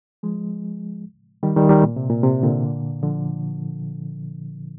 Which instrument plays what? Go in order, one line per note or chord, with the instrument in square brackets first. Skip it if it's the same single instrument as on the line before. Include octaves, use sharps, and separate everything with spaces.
[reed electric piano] F3 G#3
D#3 G3
D#3 G3
D#3 G3
A#2
C3
A#2
C3
A#2 D3
D3 F3